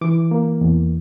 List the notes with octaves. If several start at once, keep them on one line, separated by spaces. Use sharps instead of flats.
E3 D6
A#3
E2